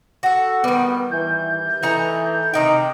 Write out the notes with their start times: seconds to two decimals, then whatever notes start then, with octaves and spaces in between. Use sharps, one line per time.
0.23 F#4 A4 F#5
0.64 D#3 G3 B3
1.11 E3 G6
1.83 E3 A3 D#4 A#5
2.54 C3 D#3 D#4 G5